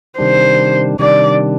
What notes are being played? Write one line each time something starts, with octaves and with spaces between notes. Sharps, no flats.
C3 D#3 G3 D4 C5
C3 D#3 G3 D4 D5